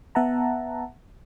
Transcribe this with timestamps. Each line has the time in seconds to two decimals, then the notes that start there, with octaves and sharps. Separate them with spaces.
0.15 B3 E5 F#5 A5 A#5